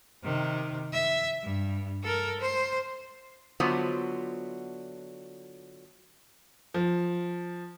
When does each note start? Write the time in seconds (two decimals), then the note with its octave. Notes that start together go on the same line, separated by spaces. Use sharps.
0.23 C3 D#3
0.92 E5
1.43 G2
2.03 A4 A#4
2.41 C5
3.60 D3 F#3 B3 F4 C5 E5
6.74 F3